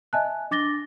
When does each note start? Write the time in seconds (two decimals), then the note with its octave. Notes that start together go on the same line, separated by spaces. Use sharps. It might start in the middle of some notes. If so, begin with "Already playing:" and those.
0.13 D#5 E5 G#5 A5 F#6
0.51 D4 D6 A6 A#6 G7